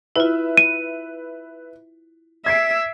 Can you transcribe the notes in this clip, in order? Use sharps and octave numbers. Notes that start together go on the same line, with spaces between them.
E4 F4 B4 E5
D#7
E5 G#6 C7 D7